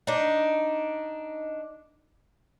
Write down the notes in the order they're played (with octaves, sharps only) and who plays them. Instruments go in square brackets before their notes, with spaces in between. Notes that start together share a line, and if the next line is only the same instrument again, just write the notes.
[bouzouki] D4 D#4